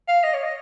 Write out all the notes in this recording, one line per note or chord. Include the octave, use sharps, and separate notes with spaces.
F5
D#5
C#5
D#5